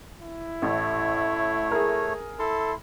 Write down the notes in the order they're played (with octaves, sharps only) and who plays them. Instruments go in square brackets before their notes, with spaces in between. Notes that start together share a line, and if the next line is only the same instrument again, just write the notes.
[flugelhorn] E4
[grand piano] A1 [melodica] A3 C#5
[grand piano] G#4 A#4
[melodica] E4 C6 [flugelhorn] A4